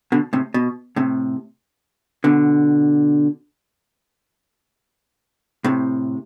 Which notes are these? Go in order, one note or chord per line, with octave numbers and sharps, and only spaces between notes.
B2 D3
A2 C3
B2
A2 C3
B2 D3
A2 C3